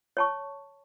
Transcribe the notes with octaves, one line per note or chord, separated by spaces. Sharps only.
C#5 A5 C#6